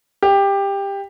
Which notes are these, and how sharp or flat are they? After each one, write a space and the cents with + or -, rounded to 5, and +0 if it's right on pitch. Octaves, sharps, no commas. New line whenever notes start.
G4 +15